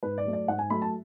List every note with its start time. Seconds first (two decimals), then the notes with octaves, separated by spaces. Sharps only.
0.03 G#2 B4
0.18 D5
0.25 F#3 A3
0.33 D5
0.48 G#2 F#5
0.59 G#5
0.70 F#3 A3 B5
0.82 A5